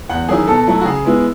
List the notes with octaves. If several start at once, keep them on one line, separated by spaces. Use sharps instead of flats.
E2 F#5
D#3 F#3 C#4 E4 G#4
B2 A4
F#3 A3 E4
F#4
C#3 G#4
G#3 B3 E4